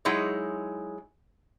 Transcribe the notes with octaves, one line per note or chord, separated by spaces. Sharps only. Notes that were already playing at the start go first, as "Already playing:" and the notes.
F#3 G#3 D#4 E4 G#4 C#5